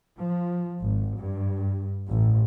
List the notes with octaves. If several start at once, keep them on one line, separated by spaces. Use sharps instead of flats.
F3
G#1
G2
A1